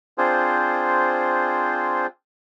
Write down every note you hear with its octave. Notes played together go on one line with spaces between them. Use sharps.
C4 D4 F4 G#4 C5